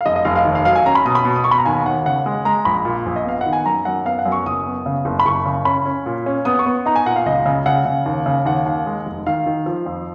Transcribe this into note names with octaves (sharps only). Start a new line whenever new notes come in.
F5
F1 D#5
D#5
F1 F5
F5
D#2
F5
F#3 F5
G#5
C#4 A#5
B5
B2 D#6
B5
B2
D#6
B2 C#6
B5
A#5
D#2 G#5
D#2 F#5
C#3 F#5
G#3
G#3 A#5
A#1 B5
A#2
A#1
D#5
B3 F5
F#5
D#3
G#5
F#2 A#5
F#2 F#5
B3 F5
F#5
F#2
C#6
F#1 D#6
B3
C#3
F#1
B5
F#1 C#6
C#3
C#4 B5
C#4
A#2
C#4
B3 D#6
C#6
B3
D#4 A#5
G#5
A#2 F#5
F5
C#2 D#5
C#3
C#3 F#5
C#3
D#2
C#3
D#2 F#5
D#2
G#3
F1
D#3 F5
D#3
F3
F2